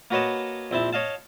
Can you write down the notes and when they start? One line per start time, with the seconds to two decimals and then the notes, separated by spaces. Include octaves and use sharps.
0.11 A#3 F#4 B4 C#5 D#5 A5
0.71 A#1 C4 E4 A5
0.93 C#5 D#5 F5 A5